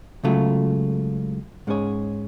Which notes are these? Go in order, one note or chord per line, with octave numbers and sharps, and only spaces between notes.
C#2 C#3 F#3 A3 F4
G#2 G#3 C#4 G#4 C#5